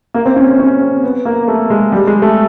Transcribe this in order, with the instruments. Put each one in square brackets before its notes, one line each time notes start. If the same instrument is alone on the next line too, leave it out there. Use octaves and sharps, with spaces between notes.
[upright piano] A#3
C4
C#4
C4
C#4
C4
B3
A#3
A3
G#3
G3
G#3
A3